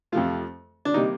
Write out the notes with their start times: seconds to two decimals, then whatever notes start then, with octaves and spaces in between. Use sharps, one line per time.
0.12 F2 C3 F3 A3 F4
0.85 D4
0.94 C3 G3 A#3 D#4